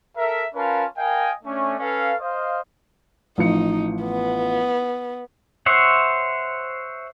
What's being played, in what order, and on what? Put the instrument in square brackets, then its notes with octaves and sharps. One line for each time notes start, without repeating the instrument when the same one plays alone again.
[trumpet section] A4 A#4 E5
C#4 F4 A#4 B4 F5 A5
A#4 D#5 F5 G5 G#5
A3 C#4 D4
C#4 A4 B4 F5
C5 D#5 F5
[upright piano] A1 F3 C#7 [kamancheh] D#4
[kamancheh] B3
[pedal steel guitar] C5 C#5 E5 F#5